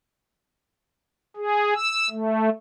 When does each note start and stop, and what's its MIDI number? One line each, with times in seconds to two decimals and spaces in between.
1.36 1.74 68
1.75 2.09 88
2.10 2.49 57